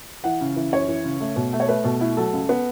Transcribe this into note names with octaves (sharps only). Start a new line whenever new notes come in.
E3 F#5
C#3
E3
F#2 C#5
E3
C#3
A3
B2
A3
C#5
A3 B4
B2 A4
A3 E4
F#3 A4
C#2
B3